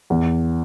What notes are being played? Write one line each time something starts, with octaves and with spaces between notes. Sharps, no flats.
E2